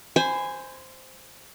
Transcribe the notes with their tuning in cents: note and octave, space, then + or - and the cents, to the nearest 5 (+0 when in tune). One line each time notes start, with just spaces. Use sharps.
C5 +0 G#5 -10 B5 +35